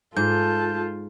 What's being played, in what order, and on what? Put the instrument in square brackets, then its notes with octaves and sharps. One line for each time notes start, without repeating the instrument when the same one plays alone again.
[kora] G#2 [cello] F4 [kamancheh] A4 A5 [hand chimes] G6